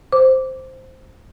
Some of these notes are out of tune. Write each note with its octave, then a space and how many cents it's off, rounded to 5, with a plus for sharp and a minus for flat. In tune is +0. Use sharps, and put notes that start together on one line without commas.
C5 +0 D6 -15